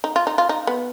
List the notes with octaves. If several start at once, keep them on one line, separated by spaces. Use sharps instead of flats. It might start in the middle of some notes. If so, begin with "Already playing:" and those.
D#4
F4
D#4
F4
D#4
B3